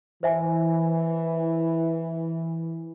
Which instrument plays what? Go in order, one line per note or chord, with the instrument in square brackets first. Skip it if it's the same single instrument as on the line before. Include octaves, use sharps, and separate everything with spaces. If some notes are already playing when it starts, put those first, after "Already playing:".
[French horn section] E3 [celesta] C5 E5 G#5